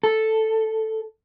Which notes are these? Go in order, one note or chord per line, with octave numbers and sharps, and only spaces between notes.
A4